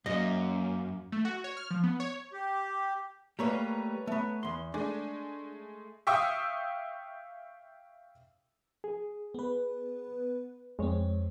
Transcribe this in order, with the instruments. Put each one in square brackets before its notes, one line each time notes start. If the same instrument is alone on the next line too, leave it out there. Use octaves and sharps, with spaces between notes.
[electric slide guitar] F#2 [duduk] A#3 [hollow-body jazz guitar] D#5
[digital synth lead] A3
F#4
C#5
F6
F3
B3
C#5
[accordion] G4
[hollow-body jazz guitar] G3 A3 A#3 [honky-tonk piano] B4 C#5 A#5
[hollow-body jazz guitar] A3 B3
E2 C6
[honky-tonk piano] G#3 A3 G#5 [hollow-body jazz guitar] D4
[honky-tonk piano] E5 F5 G5 C#6 D#6 E6
[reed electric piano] G#4
[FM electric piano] B3 B4
[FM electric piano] F2 C4 [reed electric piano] G#3 C#5